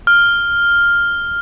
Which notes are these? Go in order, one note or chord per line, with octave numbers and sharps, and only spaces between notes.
F6